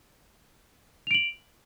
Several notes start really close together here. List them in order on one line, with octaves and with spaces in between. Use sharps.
F7 D7 F#7